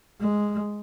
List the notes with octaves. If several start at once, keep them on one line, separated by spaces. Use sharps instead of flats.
G#3